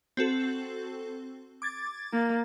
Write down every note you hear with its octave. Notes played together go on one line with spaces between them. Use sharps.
C4 F#4 A4
D6 G#6 A6
A#3